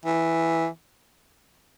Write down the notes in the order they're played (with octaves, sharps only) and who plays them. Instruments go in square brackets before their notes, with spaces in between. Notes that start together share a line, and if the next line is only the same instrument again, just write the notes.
[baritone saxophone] E3